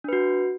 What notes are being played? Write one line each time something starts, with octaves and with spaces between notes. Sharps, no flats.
D4 F#4 B4